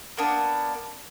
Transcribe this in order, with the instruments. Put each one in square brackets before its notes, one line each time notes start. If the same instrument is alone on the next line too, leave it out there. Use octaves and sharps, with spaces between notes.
[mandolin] A#3 B3 D4